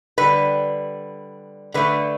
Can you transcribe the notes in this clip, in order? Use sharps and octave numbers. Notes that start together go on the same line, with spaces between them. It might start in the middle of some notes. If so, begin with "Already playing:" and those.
D3 G3 B4
D3 A3 B4